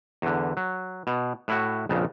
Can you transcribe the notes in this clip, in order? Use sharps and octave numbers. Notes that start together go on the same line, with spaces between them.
E2 D3
F#3
B2
A2 E4 F#4
A#1 F2 C#3